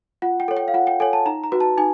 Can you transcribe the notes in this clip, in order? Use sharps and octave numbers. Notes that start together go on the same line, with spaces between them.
F4 F#5
G5
A4 C#5
G5
F5
F4 F#5
G5
A4 C#5 G#5
A5
D#4 A#5
A#5
F#4 B4
A5
D#4 G#5